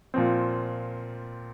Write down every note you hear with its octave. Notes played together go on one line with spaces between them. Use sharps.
A#2 F3 C4